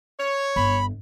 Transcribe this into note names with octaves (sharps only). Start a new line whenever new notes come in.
C#5
G1 B5